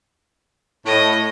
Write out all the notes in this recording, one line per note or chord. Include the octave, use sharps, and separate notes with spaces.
A2 D#5